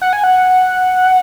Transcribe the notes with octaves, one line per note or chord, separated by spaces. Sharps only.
F#5
G#5
F#5